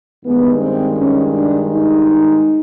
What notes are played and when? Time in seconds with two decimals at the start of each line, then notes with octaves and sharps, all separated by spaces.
0.24 G2 D#3 G#3 B3
0.60 C4
0.95 C#4
1.32 D4
1.67 D#4